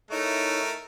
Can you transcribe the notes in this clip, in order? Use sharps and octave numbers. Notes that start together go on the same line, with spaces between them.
A3 D#4 E4 A#4 C#5